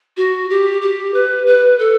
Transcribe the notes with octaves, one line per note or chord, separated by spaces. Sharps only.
F#4
G4
G4
B4
B4
A4